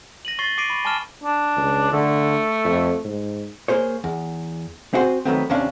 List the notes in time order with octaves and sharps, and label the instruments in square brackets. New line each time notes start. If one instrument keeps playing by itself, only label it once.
[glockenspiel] A#6 D#7 F#7
C#6 A6 A#6 C7
C#6 D6 A#6 C7 D7 D#7
B5 C#6
G#5 A5 C#6 D6 F6 E7
[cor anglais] D4
[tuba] C#2
[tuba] D3 [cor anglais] A3
[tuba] F2
G#2
[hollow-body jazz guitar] A#3 G#4 C5 C#5
E2
C4 E4 F#4 G#4 C5
D#3 F#3 A3 B3 C4
D#2 C3 C#4 D4 F5